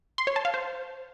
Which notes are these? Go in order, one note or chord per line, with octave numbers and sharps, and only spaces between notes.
C6
C#5
A5
F5
C5